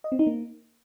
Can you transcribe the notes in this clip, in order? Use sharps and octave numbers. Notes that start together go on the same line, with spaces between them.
D#5
C4
D#4
A#3